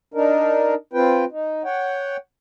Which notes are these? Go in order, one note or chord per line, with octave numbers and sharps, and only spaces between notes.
D4 D#4 A#4
C4 F4 B4 G5
D#4
C#5 F#5 G5